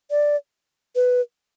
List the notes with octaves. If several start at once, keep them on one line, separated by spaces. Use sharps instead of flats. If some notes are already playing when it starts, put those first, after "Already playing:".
D5
B4